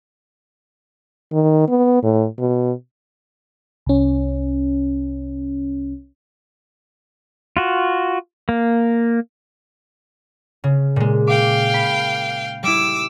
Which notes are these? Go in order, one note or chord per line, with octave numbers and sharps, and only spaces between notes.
D#3
B3
A2
B2
C2 C#4
F4 F#4
A#3
C#3
A#2 G#3
F5 G5 D6
B5
G3 E4 D6 E6